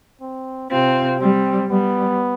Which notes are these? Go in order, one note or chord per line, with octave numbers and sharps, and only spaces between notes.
C4
C3 C4 F4
G3 C4
G3 B3